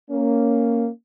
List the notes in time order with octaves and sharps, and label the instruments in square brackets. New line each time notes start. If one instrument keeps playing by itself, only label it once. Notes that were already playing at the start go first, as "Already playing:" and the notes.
[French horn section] A#3 C#4